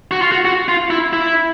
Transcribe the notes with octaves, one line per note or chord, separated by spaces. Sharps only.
F#4
F4
F#4
F#4
F4
E4
E4